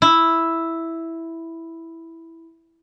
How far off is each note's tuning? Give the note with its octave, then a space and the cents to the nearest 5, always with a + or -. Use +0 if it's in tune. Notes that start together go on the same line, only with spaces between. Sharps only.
E4 +0